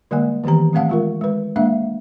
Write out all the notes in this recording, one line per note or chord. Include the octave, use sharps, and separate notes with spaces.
D3 G3 G#3 A#3 G#5
D#3 E3 B3 G4 A#5
G3 A3 C4 F5 F#5 A5
G#3 F4 A#4
G#3 B4
G#3 A#3 D4 E5 F5